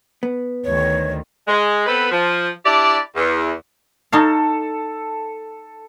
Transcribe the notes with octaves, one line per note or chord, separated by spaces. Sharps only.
B3
D2 D#3 C#5
G#3
B3 C4 A4 B4
F3
D4 E4 G4 D5
E2
D#4 A4 C#5 F5